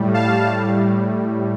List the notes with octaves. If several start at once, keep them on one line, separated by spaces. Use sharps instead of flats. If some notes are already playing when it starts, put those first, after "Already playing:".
Already playing: A2 G3
F5 A5
A2 G3